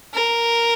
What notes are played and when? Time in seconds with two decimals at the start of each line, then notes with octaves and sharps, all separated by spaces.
0.14 A#4